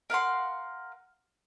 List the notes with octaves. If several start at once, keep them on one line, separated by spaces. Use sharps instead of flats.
A#4 F5 F#5 C6